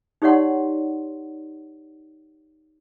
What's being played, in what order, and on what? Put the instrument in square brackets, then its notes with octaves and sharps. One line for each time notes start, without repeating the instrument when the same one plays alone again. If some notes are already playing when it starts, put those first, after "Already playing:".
[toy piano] D#4 G4 C#5 D5 F#5 C6